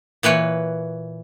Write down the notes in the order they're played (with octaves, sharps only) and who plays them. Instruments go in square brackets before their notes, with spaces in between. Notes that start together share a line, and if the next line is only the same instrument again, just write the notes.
[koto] A#2 E3 B4 C#5